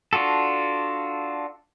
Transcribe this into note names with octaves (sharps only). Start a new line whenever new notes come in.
D4 F4 F#4 A4